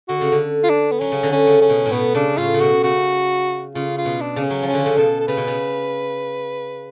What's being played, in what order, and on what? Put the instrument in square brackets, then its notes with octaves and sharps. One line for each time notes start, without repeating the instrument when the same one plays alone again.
[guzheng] D3 [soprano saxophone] F#4
[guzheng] C#3
D3
[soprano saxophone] F4
D4
B3
[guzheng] F#3 [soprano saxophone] C#4
[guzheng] C#3
D3
[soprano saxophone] C#4
[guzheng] C#3
[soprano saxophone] C#4
[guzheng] B2
A2
[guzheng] B2 [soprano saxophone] B3
[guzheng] C#3 [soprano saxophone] D4
[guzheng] A2 [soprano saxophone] F4
[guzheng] C#3
[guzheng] B2 [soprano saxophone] F#4
[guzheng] C#3 [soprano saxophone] F#4
[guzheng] C#3 [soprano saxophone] F4
[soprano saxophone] F4
[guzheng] B2
[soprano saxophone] D4
[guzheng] C#3
[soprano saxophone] C#4
[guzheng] F#3
[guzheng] F3 [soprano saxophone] C#4
[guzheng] D3
C#3
[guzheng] B2 [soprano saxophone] A4
[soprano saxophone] A4
[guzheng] C#3 [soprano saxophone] B4
[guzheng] B2
C#3